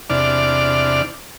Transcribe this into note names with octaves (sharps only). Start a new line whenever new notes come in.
E2 C3 D4 D5 F6